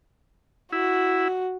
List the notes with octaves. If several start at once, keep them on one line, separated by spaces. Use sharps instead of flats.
E4 F#4